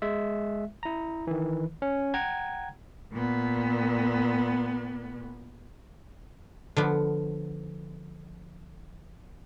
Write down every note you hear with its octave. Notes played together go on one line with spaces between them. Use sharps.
G#3 E5
E4 A#5
D#3 E3
C#4
F#5 G5 A#5 G#6
A#2 B3
D3 F3 B3